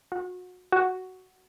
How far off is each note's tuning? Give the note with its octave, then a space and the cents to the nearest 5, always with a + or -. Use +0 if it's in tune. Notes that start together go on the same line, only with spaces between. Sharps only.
F#4 -30
F#4 +5